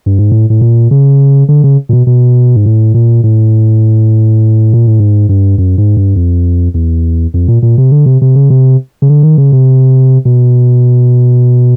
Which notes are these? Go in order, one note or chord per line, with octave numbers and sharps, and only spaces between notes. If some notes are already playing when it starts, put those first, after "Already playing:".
G2
G#2
A2
A2
A#2
C#3
D3
C#3
A#2
B2
B2
G#2
A2
A#2
A2
A#2
A2
G#2
G2
F#2
G#2
G2
F2
E2
F2
A#2
A#2
C3
D3
C3
C3
C#3
C3
C#3
D3
D#3
C#3
C3
B2